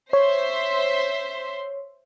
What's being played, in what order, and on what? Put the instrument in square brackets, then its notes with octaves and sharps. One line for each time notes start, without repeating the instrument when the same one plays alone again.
[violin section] C5 E5 C6 [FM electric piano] C#5